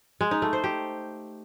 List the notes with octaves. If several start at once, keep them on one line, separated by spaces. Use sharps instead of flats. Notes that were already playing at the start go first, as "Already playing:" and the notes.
G#3
D#4
A3
C5
G4